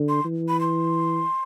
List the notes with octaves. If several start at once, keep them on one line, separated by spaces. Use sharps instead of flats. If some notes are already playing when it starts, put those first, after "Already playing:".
Already playing: D3
C6
E3
B5
C6